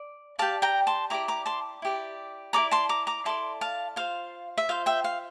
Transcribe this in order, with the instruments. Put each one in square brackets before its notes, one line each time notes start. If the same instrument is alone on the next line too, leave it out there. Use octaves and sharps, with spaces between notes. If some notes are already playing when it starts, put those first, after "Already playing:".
Already playing: [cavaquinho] D5
G4 D5 F5 A5
G5 A#5
A5 C6
E4 G4 D5 A#5 D6
A#5 D6
A5 C6
E4 G4 D5
E4 A4 D5 A#5 D6
A5 C6
A#5 D6
A#5 D6
E4 A4 D5 A5 C6
F5 A5
F4 C5 F5
E5
F4 C5 F5
E5 G5
F5